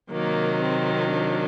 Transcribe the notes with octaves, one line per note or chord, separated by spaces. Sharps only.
C3 D#3 F#3 A#3
C4
D4